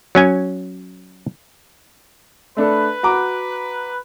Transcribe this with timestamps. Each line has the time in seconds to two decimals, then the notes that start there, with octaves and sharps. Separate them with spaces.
0.15 F#3 C#4 G#5
2.57 A3 D4 A4 B4
3.03 F#4 A#5 D6